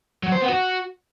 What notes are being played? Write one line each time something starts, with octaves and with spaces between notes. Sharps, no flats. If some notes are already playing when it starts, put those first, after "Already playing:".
F#3
C5
B3
F#4